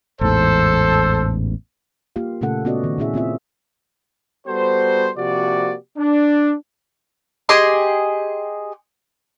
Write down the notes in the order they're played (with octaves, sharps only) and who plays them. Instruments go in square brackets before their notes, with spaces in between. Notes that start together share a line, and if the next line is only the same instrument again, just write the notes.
[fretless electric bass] A1 E2 G#2 [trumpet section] A4 C5
[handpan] A#3 F4 G4 F5
A#2 C#3 A3 C#4 A4 F#5
B3 C#4 F#4 D5 D#5
D#3 A#3
A#2 D#3 C#4 E4 G#4 E5
A#3 C4 F4 E5
[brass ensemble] G3 B3 F#4 A4 C5
C3 F3 A#3 F#4 G4 D5
D4
[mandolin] G4 G#4 D#5 C6